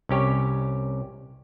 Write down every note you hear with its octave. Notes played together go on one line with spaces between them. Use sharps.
C2 C#4 G4 C#5